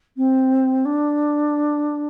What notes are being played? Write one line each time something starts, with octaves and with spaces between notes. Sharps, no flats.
C4
D4